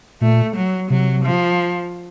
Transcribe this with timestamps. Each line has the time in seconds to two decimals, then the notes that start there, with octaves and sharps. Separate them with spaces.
0.21 A#2 A3
0.56 F#3
0.90 C3 F#3
1.24 F3